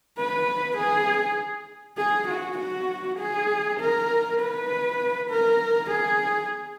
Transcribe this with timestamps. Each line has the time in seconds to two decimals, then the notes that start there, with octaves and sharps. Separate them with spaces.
0.18 B4
0.78 G#4
1.98 G#4
2.28 F#4
2.58 F#4
3.19 G#4
3.80 A#4
4.40 B4
5.30 A#4
5.91 G#4